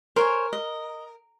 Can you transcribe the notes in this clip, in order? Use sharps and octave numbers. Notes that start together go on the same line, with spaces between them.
A#4 C5 C#5 G#5
D#5